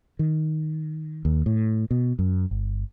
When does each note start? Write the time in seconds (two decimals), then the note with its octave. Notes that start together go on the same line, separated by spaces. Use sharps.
0.19 D#3
1.25 D#2
1.46 A2
1.91 B2
2.19 F#2
2.51 G1